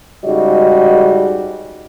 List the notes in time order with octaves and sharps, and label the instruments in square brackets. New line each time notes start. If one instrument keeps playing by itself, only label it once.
[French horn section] G#2 C#3 G3 F#4 D#5